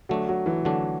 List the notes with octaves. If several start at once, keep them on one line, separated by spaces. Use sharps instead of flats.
D3 F#3 A3 D4
F#3
E3
D3 F#3 A3 D4